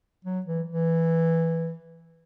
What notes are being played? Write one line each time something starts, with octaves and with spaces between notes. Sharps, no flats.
F#3
E3
E3